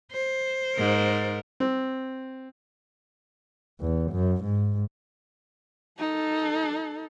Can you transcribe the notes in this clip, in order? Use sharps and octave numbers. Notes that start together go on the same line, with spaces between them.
C5
G#2 A#4
C4
E2
F#2
G#2
D#4 A4